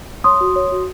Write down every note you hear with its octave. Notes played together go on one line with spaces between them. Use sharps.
C#5 C6 D#6
F#4
C#5
F#4